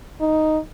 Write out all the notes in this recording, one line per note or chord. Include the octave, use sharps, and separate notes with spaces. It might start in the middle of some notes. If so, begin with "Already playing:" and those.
D#4